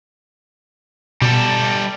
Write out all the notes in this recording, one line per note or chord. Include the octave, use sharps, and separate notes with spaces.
B2 G3 A4